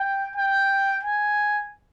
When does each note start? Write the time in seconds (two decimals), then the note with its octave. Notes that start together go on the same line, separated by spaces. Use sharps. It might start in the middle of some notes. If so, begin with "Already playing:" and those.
Already playing: G5
0.36 G5
1.03 G#5